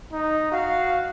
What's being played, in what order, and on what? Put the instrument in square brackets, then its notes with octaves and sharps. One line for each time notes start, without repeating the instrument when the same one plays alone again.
[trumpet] D#4
[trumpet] F#4 [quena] F5